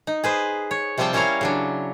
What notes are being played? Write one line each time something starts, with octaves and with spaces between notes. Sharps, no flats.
D#4
G#4 B4 C5
C#5
C3 F3 G3 C4 G5 A5
G3 C#4 E4 A#4 C#5 F5
C#3 F#3 D4